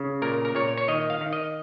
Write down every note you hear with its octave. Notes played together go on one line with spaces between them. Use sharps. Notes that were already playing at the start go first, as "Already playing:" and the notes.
Already playing: C#3
A#2 A#4
A#4
A#2 C#5
C#5
D#3 D#5
F5
D#3
D#5